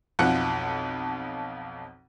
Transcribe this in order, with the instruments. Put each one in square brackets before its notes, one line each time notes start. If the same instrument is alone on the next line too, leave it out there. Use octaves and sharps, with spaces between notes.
[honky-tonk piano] B1 F2 F3 F#5 C#7